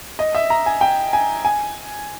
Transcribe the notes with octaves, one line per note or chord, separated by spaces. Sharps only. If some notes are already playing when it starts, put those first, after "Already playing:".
D#5
E5
A#5
G#5
G5
G#5
G#5